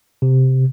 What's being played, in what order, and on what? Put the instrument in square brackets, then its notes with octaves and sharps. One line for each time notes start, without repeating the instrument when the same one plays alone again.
[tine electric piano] C3